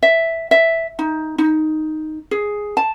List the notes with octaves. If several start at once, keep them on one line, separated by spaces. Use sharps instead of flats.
E5
E5
D#4
D#4
G#4
A5